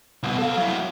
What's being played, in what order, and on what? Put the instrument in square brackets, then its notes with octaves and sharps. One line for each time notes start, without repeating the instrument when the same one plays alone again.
[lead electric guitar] C2 B2
A4 F5
F#3 E4